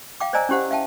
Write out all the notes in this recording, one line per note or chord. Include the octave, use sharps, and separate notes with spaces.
F5 G5 D6
C5 D5 D#5 G#5 A#5 E6
C#4 E4 G4 C5 F#5
E5 F5 G5 A5